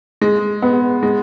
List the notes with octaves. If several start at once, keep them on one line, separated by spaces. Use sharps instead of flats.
G#3
B3
G#3